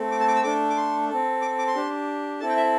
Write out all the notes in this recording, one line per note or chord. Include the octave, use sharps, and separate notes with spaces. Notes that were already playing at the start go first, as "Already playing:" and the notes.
Already playing: A3 C4 A4
D6
A5
D6
E6
A3 D4 A4 D6
D6
C6
C4 A4
D6
D6
C6
D4 G4
C4 E4 A4 A5
G5
E5